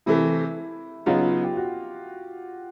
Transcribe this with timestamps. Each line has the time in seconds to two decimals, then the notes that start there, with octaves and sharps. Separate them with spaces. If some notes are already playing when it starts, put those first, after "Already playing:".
0.06 C3 E3 A3 E4
1.06 C#3 F#3 B3 D#4 F4
1.44 G4
1.57 F#4